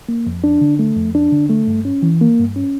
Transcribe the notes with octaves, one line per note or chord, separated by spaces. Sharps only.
A#3
F2
D4
D3
A3
F2
D4
D3
A3
G2
C#4
E3
A#3
G2
C#4